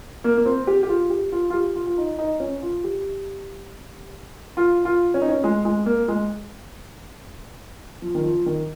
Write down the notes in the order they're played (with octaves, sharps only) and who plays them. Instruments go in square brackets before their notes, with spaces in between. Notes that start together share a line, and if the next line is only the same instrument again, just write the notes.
[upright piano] A#3
A#3
C4
G4
G4
F4
G4
F4
F4
G4
F4
F4
D#4
D#4
C#4
F4
G4
F4
F4
C#4
D#4
C#4
G#3
G#3
A#3
G#3
F3
D#3
F3
D#3